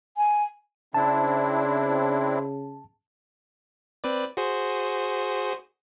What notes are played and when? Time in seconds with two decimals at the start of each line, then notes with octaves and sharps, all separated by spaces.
0.17 G#5
0.94 C#3 C4 D4 E4 A5
4.04 C4 B4 D5
4.37 F#4 G#4 C5